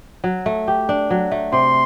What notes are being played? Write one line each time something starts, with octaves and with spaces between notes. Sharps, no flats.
F#3
A3
G4
D4
F#3
A3
C3 C6